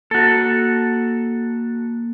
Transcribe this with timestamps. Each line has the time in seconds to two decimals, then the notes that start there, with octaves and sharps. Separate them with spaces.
0.11 A#3 F#4 A4